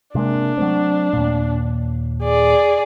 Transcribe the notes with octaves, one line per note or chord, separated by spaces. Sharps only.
C3 G#3 A#3 D4
F#3 A3 C4
D#2 A#2
G#4 D5